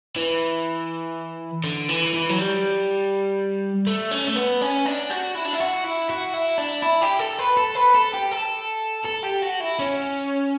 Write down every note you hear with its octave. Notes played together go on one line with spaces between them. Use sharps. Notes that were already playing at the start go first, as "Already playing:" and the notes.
E3
D3
E3
E3
F#3
G3
A3
C#4
A3
B3
C#4
D4
F#4
E4
D4
E4
F#4
E4
F#4
E4
D4
E4
G4
A4
B4
A4
B4
A4
G4
A4
A4
G4
F#4
E4
C#4